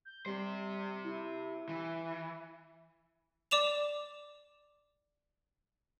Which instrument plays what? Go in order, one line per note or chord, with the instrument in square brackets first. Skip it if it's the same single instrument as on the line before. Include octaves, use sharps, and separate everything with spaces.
[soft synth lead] G6
[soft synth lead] G3 [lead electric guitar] G4 C5
[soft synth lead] E4
[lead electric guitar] E3
[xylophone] D5 D6 E7 F7